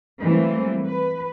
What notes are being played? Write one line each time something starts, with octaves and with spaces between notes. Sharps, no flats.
E3 F#3 G3 A3 A#3 C4
B4